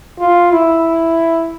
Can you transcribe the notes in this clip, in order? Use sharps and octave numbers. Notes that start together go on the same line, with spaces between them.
F4
E4